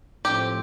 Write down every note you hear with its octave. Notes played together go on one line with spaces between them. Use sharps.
A2 F3 C4 G4